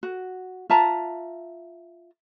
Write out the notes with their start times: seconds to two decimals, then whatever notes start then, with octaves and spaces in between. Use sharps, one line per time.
0.03 F#4
0.70 F4 E5 A5 A#5